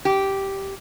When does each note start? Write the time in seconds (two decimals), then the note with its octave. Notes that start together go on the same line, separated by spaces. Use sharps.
0.05 G4